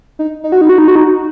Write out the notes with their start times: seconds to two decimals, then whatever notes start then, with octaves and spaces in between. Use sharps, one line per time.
0.19 D#4
0.44 D#4
0.52 F#4
0.61 D#4
0.69 F#4
0.78 D#4
0.88 F#4
0.96 D#4